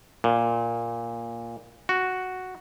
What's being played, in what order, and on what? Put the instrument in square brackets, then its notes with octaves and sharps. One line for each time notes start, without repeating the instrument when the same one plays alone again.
[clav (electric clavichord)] A#2
F#4